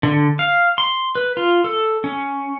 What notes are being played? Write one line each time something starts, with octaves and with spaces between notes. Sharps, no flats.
D3
F5
C6
B4
F4
A4
C#4